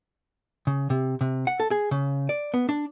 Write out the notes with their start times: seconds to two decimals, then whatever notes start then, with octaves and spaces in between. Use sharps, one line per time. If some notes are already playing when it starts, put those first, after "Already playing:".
0.67 C#3
0.90 C3
1.21 C3
1.47 F#5
1.60 A4
1.71 G#4
1.91 C#3
2.29 D5
2.54 B3
2.69 D4